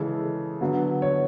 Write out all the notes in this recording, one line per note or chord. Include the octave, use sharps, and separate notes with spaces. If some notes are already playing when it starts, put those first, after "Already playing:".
Already playing: C#3 E3 G#3 A4
D3 F#3 B3
C#5